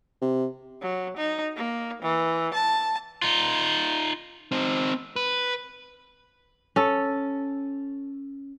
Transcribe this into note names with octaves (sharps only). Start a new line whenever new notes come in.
C3
F#3
D#4
A#3
E3
A5
D#4 F4
C4 D#4
B4
C#4 A4